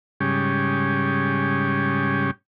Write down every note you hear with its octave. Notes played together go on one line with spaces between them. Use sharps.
G#2 C#3 G3 C#4 G4